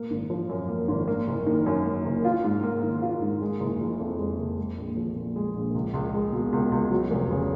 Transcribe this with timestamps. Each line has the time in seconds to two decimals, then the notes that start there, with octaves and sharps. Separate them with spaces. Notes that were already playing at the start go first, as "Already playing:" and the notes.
Already playing: A#2 A#3
0.11 G#1
0.30 F3
0.49 F#2
0.69 A#3
0.88 G#1
1.08 A#3
1.27 F#1
1.46 D#3
1.66 F#2
1.86 A#3
2.05 F#1
2.24 F4
2.44 G#2
2.63 A#3
2.83 D#3
3.02 F4
3.22 G#2
3.42 G#3
3.60 F#1
3.80 F3
3.99 F2
4.19 G#3
4.38 F#1
4.58 G#3
4.78 A#1
4.97 F3
5.16 A#2
5.36 G#3
5.55 A#1
5.75 C#2
5.94 C#2
6.14 G#3
6.33 B2
6.53 C#2
6.72 C#2
6.91 F#3
7.11 F1
7.30 C#3